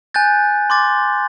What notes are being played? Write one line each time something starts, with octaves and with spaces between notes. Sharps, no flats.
G#5 F#6 G6 A6
C6 D6 A6